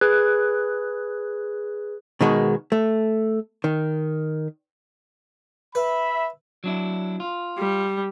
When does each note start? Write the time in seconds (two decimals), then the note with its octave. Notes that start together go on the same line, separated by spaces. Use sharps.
0.01 G#4 B4 F#6 G#6
2.21 B2 D#3 G#3 F#4
2.72 A3
3.64 D#3
5.75 B4 E5 B5
6.64 F#3 D4 E4
7.20 F4
7.58 G3